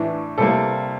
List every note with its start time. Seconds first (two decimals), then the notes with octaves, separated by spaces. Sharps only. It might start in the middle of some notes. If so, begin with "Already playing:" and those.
Already playing: A2 E3 A3 D4
0.38 C3 G3 A#3 A4